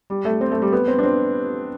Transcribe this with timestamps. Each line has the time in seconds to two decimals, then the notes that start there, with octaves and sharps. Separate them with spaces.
0.10 G3
0.25 A3
0.41 C4
0.52 A3
0.62 G3
0.72 B3
0.88 C4
0.99 D4
1.03 C4